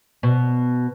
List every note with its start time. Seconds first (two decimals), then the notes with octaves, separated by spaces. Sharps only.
0.23 B2